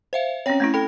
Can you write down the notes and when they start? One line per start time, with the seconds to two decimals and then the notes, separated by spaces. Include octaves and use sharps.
0.13 C5 E5 F5
0.46 C4 C#4 C#5 G5 A#6
0.60 A3 C#4 E4 G#6 A#6
0.74 A4 G5 B5